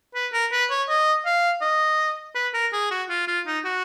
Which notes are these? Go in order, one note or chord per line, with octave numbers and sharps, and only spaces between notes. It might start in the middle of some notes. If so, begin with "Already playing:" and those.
B4
A#4
B4
C#5
D#5
F5
D#5
B4
A#4
G#4
F#4
F4
F4
D#4
F#4